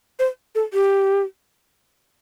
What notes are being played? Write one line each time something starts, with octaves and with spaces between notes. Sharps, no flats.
C5
A4
G4